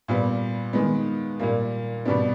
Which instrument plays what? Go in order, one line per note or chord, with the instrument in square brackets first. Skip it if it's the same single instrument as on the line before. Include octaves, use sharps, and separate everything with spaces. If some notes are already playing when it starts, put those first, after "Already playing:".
[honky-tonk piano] A#2 G3 B3
D#3 G#3 B3
A#2 G3 A#3
B2 G3 B3 D4